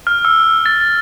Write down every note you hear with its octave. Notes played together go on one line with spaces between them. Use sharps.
F6
E6
A6